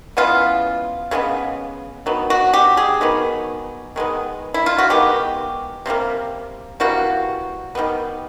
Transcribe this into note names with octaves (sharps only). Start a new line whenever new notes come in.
C#3 E3 G#3 B3 F4
C#3 E3 G#3 B3
D#3 F#3 B3
F#4
G4
G#4
D#3 F#3 B3
D#3 G#3 B3
E4
F4
F#4
D#3 G#3 B3 G4
C3 E3 G3 A#3
C3 E3 G3 A#3 F#4
D#3 G3 B3